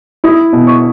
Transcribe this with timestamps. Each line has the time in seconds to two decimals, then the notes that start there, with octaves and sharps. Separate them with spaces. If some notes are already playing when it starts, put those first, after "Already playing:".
0.24 E4 D#6
0.53 B2
0.67 C#6